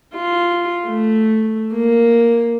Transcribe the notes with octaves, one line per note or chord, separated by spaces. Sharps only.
F4
A3
A#3